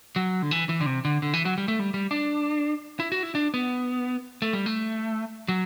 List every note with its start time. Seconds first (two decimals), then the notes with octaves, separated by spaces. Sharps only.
0.16 F#3
0.42 D3
0.51 E3
0.69 E3
0.81 D3
0.86 C3
1.05 D3
1.22 D3
1.33 E3
1.45 F#3
1.58 G3
1.68 A3
1.80 G3
1.94 G3
2.11 D4
3.00 E4
3.12 F#4
3.23 E4
3.35 D4
3.54 B3
4.42 A3
4.53 G3
4.66 A3
5.48 F#3